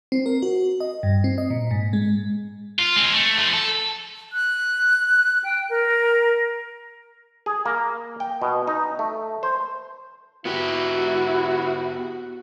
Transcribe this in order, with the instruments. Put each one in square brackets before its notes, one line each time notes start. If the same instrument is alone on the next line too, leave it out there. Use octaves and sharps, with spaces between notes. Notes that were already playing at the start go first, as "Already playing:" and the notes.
[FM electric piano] C4
A#4
F#4
D#5
G2
C4
D#5
A#2
G#2
G#3
[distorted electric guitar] F4
G#3 C4
A3
F3 A3
A4
[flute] F#6
G5
A#4
[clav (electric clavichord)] G#4
A#3
G5
B2
D#4
A3
C5
[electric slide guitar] B3 G4 [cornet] E4 [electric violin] F#4